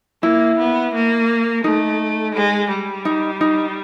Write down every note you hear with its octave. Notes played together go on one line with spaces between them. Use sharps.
A#3 E4
B3
A#3
A3 D#4
G#3
G3
D#4
D#4